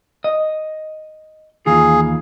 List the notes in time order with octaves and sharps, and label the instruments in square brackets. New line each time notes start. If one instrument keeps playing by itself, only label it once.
[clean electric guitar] D#5
[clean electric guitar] D#2 E3 F4 [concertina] G#4